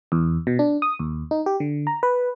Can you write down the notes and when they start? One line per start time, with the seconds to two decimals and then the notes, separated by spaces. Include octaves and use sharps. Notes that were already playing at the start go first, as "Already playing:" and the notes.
0.12 E2
0.47 B2
0.59 D4
0.82 D#6
0.99 D#2
1.31 D#4
1.46 G4
1.60 D3
1.87 A#5
2.03 B4